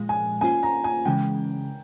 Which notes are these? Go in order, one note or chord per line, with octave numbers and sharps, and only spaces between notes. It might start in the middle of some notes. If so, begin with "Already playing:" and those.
Already playing: A#2 F3 G#3
G#5
A#3 C#4 F4 C5 G#5
A#5
G#5
C#3 E3 G#3 C#4 G5